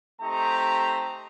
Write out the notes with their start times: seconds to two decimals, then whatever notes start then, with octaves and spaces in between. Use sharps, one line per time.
0.22 A3 C4 D#4 G4 A#5